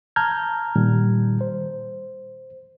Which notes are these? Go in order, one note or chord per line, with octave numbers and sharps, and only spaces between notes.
A5 A#5 F6 G6 G#6
A#2 D#3 G3
C5